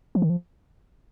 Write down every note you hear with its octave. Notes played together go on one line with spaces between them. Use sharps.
F3
D#3
F3